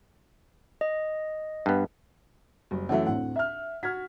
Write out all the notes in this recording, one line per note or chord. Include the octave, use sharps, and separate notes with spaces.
D#5
G2 B3
F#1 G3
F#2 E3 A3 E5 F#5
D2 A2 C4 F#5
E5 F6
F#4 F6 G#6 B6